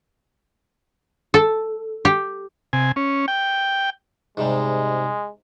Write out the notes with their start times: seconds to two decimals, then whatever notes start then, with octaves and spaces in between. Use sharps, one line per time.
1.34 A4
2.05 G4
2.73 C3 G#5
2.96 C#4
3.28 G5
4.37 G#2 C3 G3 G#3